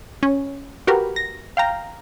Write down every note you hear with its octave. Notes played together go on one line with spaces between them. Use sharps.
C#4
F#4 G4 A#4 B4
A#6
F5 G5 A#5